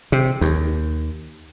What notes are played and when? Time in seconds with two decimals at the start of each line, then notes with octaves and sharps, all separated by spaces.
0.12 C3
0.41 D#2